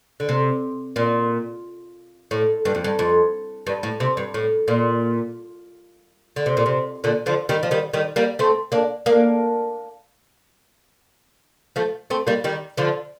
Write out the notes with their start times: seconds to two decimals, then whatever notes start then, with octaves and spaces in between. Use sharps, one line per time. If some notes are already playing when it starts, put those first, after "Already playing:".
0.20 D3
0.29 C3
0.96 A#2
2.31 A2
2.65 G2
2.75 F2
2.84 G2
2.99 F2
3.67 G2
3.83 A2
4.00 C3
4.17 G2
4.34 A2
4.68 A#2
6.36 D3
6.46 C3
6.57 A#2
6.66 C3
7.04 A#2 D3
7.26 D3 F3
7.49 D#3 G3
7.63 F3
7.71 D#3 G3
7.93 D#3 G3
8.16 G3 A#3
8.39 A3 C4
8.72 A#3 D4
9.06 A#3 D4
11.76 F3 A3
12.10 A3 C4
12.27 G3 A#3
12.44 D#3 G3
12.77 D3 F3